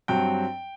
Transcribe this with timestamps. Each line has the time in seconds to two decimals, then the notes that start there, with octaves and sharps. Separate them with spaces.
0.08 G2 F#3 C4 G5